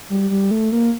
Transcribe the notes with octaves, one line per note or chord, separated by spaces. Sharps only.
G3
G3
A3
A#3